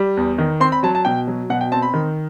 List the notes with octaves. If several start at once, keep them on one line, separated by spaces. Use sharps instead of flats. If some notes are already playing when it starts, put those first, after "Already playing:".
Already playing: G3
E2
D#3
C4 C6
B5
F#3 A5
A5
B2 G5
F#3
B2 F#5
G5
C4 A5
B5
D#3